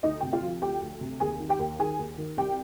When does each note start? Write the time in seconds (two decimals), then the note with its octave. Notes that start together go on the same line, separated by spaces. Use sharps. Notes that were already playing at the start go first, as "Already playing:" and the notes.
0.03 D2 D#4 D#5
0.21 C3 G5
0.33 F4 F5
0.42 F3
0.62 D2 G4 G5
0.82 D2
1.01 C3
1.20 D#2 G#4 G#5
1.40 D#3
1.49 G4 G5
1.59 D#2
1.79 D#3 G#4 G#5
1.99 D#2
2.18 D#3
2.37 C2 G4 G5